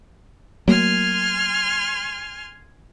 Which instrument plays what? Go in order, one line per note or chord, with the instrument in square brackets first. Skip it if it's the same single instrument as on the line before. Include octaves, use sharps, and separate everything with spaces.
[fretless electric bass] F#3 A3 A#3 [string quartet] G#5 C6 F6